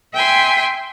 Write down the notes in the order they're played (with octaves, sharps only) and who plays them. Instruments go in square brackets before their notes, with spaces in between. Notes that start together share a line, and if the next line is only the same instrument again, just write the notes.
[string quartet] E5 G5 G#5 C6